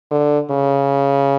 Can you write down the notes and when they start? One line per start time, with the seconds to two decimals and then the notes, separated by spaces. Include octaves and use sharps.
0.11 D3
0.51 C#3